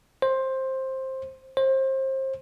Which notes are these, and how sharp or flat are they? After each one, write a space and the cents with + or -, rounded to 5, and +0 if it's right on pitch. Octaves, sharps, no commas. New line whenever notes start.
C5 +15
C5 +30